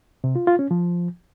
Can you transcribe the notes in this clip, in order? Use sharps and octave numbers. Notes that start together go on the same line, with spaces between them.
C3
F4
F4
C#4
F3